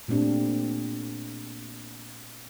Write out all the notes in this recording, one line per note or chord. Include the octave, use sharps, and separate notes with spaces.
A#2 A3 C4 D4 G4